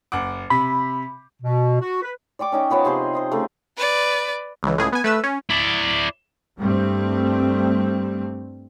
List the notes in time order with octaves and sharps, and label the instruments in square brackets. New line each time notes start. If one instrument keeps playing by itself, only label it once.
[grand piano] F#1 F#5 D6
[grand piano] C3 [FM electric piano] B5
[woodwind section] B2
F#4
B4
[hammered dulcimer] D5 G5 C#6 D6
C#4 D#4 G5
F3 B3 C#5 A5
C3 G#4 C5 G#5
C5 D#5 A5
C#3 A3
[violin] B4 D5
[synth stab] C#2 E3
C#2 A2 G#4
B3 G#5
A3 B4 E6
C#4
[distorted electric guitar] E4 D5
[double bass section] G2 G3 A3 C4